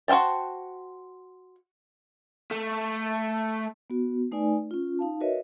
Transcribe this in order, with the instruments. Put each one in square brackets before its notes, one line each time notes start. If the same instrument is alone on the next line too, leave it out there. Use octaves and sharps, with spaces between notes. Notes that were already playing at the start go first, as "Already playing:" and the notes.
[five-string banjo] F#4 C5 F5 G5 A5
[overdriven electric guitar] A3
[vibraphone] B3 F#4
A3 D#4 B4 D5 G#5
C#4 F4
D#4 F5 A5
F#4 A#4 B4 C#5 D#5 E5